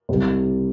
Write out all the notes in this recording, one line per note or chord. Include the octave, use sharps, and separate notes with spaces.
C2 C3 G3